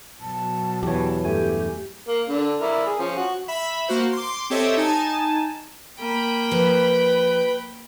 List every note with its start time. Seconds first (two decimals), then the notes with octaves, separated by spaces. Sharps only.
0.20 B2 F#3 A5
0.83 E2 E3 G4 C#5
1.25 G2 A3 G4 G#5
2.08 A#3
2.28 D3 D4
2.61 E4 A#4 D5
2.86 G#4
2.99 F3 C#4
3.17 F#4
3.48 E5 B5
3.88 A#3 F#4 C5
4.13 C6 D6
4.50 C4 G4 A4 C#5 D#5 E5
4.77 D#4 G#5 A5
5.99 A#3 G5 B5
6.52 F3 B4